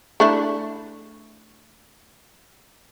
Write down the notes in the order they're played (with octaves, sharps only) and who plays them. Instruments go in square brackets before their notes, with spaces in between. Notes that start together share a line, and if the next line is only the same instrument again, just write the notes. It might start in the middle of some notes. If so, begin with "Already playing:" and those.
[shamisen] A3 D4 E4